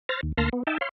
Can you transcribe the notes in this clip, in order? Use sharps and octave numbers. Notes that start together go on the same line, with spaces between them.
C5 F6 A6 A#6
D#2
D2 A#3 A5 C6 F6 A#6
B3
D#4 E5 G5 A5
C#5 F5 C6